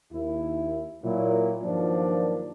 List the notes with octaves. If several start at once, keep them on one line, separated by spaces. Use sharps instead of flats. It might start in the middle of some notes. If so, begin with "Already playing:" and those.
D#2 E4
A#2 F#3 E4
G2 D#3 F3 F#3 A#3 D4